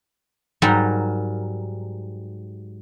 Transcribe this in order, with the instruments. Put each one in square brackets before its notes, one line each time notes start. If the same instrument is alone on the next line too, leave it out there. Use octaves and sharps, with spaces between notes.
[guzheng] G#2 F#3 G3 A#4